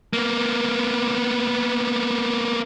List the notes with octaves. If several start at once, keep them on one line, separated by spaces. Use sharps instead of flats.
A#3 B3